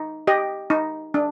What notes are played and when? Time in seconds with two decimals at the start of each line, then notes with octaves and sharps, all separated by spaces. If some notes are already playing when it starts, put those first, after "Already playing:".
Already playing: D#4
0.27 G4 D#5
0.70 D#4
1.14 D4